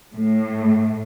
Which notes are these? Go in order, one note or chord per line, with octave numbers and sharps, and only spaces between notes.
A2